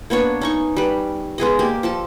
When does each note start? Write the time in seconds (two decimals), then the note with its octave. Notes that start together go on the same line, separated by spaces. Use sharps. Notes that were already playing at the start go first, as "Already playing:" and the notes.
0.10 A#3 B3 D4 C#5
0.41 C#4 D#4 C#6
0.76 G3 B4
1.38 G#3 B3 G#4 D#5
1.59 A#3 G4 D5
1.83 F3 A4 A5